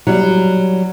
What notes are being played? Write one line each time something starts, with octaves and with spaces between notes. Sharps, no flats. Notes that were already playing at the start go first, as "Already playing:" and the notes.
F#3 G3